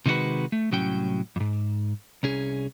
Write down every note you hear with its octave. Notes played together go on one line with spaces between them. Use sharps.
C3 D#3 G#3 B3 F#4 B4
A3
C2 A2 F#3 C#4 G5
F2 G#2
C2 C#4 G#4